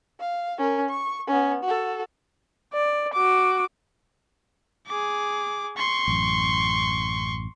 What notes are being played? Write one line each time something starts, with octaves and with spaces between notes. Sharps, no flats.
F5
C#4 A#4
C#6
B3 C#4
F#4 A4
D5
F#4 D6
G#4 D6
C6 C#6
A1 F#2